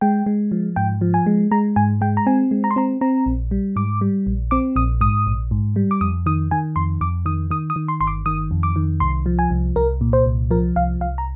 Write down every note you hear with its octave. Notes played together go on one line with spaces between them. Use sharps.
G#3 G5
G#3
F3
G#2 G5
F3
G#5
G#3
G#3 A#5
G#2 G#5
G#3 G5
A#5
C4 G#5
G#3
A#5
C6
C4 A#5
C4 A#5
A#1
G3
G#2 D6
G3
A#1
C4 D6
A#1 D#6
G#2 D#6
A#1
G#2
G3
D6
F2 D#6
D#3 D#6
D#3 G#5
F2 C6
F2 D6
D#3 D#6
D#3 D#6
D#6
D#3
C6
G1 C6
D6
D#3 D#6
F2
D6
D#3
C2 C6
F3
G#5
C2
C2 A#4
A#2
C5
C2
F3 A#4
C2 F5
C2 F5
A#5